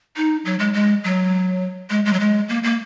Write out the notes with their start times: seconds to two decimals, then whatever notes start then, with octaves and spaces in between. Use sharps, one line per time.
0.16 D#4
0.45 F#3
0.59 G#3
0.74 G#3
1.04 F#3
1.90 G#3
2.05 G#3
2.13 F#3
2.20 G#3
2.49 A#3
2.63 A#3